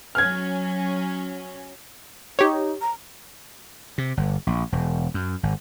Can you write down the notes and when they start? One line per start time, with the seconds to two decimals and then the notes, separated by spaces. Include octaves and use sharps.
0.15 F#3 C#4 F6 G#6
2.39 D#4 G4 C#5
2.81 A#5
3.98 C3
4.17 G1
4.47 A#1
4.72 E1
5.14 F#2
5.43 G#1